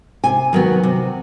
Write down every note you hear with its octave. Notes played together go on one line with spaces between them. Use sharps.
C3 G#5
D#3 F#3 B3
C3